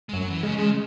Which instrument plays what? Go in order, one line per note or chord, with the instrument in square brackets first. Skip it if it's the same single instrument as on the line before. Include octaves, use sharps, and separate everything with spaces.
[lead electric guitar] G#3
[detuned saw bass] F#2 [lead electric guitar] F#3
[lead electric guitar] E3
[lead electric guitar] C#3 [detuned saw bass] G#3
[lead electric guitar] C#3